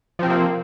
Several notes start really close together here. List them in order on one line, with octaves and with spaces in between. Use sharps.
F3 C4 C3 A#3